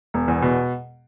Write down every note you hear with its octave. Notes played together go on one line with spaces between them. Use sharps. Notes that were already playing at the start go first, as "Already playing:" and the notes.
E1
E2
B2